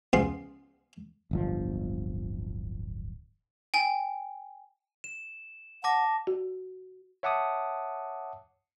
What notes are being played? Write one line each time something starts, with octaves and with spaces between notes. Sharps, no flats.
C#2 B3 G#4 D5 F5 C6
D1 G1 F3
G5 G#5
E7
F#5 A5 D6 A#6
F#4
C#5 E5 F#5 A5 D6 D#6